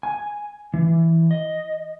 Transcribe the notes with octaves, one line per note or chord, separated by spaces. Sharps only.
G#5
E3
D#5